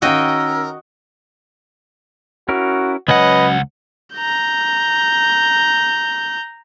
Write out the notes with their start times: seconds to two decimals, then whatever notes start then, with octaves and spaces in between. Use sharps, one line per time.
0.02 D#3 C#4 F#4 A#4 D#5 F5 G5 E6
2.49 C#4 E4 F#4 A#4
3.08 C#2 F#3 C#4 B4 D#5 F#5 G#5
4.15 A#5 G6